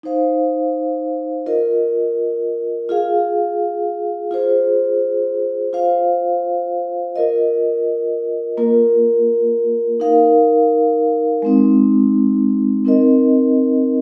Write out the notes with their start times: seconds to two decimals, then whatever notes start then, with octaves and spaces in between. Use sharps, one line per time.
0.03 D#4 C5 F5
1.46 F4 A#4 D#5
2.89 F4 G#4 F5
4.31 F4 G#4 C5
5.73 F4 C5 F5
7.16 F4 A#4 D#5
8.57 A#3 F4 A#4
10.00 D#4 A#4 F5
11.42 G#3 C4 D#4
12.85 C4 D#4 A#4 D#5